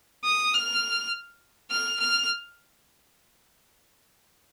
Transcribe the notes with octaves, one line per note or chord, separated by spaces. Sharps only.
D#6
F6
F6
F6